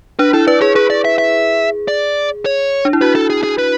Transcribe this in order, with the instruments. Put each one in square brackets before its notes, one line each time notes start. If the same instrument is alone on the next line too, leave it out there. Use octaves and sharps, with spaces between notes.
[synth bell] D4 [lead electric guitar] B4
[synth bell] E4 [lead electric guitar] A4
[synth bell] B4 [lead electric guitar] D5
[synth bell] G#4 [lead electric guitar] C#5
[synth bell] G#4 [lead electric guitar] B4
[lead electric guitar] D5
E5
E5
D5
C#5
[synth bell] D4
E4
[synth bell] F#4 [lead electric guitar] B4
[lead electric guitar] A4
G#4
G#4
B4